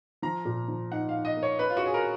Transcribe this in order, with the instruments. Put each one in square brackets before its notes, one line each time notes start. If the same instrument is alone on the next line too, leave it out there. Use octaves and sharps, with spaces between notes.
[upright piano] F3 [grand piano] A#5
[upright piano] A#2
F3
[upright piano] D#4 [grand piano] F#5
[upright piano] D#4 [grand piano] F5
[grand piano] D#5
[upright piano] A#3
[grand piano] C#5
[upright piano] C#4 [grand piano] B4
[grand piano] F4
F#4
[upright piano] C#4 [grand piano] G#4
[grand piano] A#4